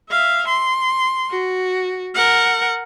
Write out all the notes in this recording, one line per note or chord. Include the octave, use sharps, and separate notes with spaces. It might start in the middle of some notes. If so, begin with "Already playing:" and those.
E5 F5
C6
F#4
A#4 F#5